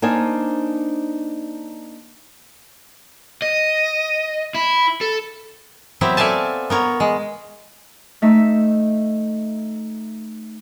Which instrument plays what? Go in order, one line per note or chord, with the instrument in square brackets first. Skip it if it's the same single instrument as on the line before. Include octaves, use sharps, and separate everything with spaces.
[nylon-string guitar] A#3 D4 D#4 C5 F5 G#5
[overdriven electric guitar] D#5
E4
A4
[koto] F#3 B3 C4 E4 G4 E5
A4 D5 E5 F5 G#5 A5
B3 A#4 C#5
G#3
[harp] A3 D#4 E5